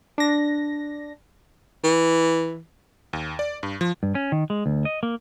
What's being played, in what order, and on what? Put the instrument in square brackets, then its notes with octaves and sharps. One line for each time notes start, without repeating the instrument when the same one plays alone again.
[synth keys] D4 A#6
[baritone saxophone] E3
[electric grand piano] D#2
D5
G2
F3
[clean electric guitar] G2
C#4
D#3
G#3
D2
D#5
A#3